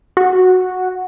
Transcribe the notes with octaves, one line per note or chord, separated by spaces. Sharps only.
F#4